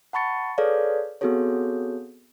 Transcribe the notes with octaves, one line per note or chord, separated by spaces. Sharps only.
F#5 A5 B5 C#6 A6 C#7
G#4 A4 B4 C#5 D5 F5
B3 C4 F#4 G#4 A4 C#5